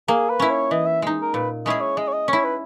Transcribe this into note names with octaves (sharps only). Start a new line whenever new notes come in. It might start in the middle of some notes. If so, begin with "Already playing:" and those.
A#3 G#4
B4
C#4 E4
C#5
E3 D#5
E5
G#3 D#4
A#4
A#2 B4
G#3 C#4 E4 G#4 D#5
C#5
G#3 D#5
C#5
D#5
C#4 E4 C#5
B4